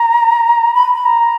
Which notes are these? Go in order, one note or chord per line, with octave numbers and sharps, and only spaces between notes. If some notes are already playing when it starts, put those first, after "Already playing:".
Already playing: A#5
B5
B5
A#5